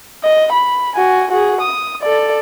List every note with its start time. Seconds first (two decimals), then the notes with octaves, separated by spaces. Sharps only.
0.24 D#5
0.53 B5
0.96 F#4 G#5
1.32 F#4 G#4
1.61 D#6
2.02 A4 D5